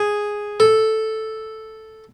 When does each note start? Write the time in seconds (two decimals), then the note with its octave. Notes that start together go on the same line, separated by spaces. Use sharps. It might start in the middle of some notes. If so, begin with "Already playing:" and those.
Already playing: G#4
0.60 A4